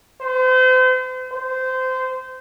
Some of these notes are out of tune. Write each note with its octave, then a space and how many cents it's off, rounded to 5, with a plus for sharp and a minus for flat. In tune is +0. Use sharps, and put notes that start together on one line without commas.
C5 -40
C5 -20